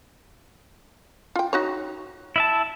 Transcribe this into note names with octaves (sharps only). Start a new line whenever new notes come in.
F4 G5
D#4 F#4 C#5
E4 E5 A5